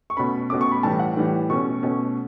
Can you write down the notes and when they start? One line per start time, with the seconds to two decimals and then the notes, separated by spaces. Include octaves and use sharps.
0.10 C#6
0.17 B2 A3 C#4 B5
0.50 B2 A3 C#4 D6
0.61 C#6
0.72 B5
0.83 A2 E3 G3 A5
0.99 F#5
1.17 A2 E3 G3
1.50 B2 A3 C#4 C#6
1.83 B2 A3 C#4